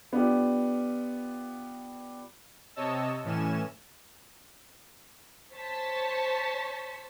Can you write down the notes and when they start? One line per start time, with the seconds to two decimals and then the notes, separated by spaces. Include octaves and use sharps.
0.13 B3 D4 F4 G4
2.76 C3 C#5 D#5 A5 E6
3.24 A2 E3 C#4 G#5 E7
5.55 C5 C#5 A5 B6